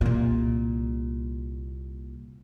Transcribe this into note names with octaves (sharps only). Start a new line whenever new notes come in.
C2 A#2